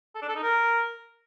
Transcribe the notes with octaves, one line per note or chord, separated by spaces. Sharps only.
A4
D4
A4
D#4
A#4